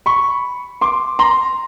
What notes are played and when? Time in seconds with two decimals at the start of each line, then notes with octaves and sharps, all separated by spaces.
0.06 B5 C#6
0.81 C6 D6
1.19 A#5 C6